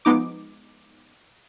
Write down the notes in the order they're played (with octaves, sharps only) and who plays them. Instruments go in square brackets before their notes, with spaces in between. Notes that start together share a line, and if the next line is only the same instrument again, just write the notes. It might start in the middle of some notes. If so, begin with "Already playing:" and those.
[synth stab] F3 G#3 B3 D#4 D6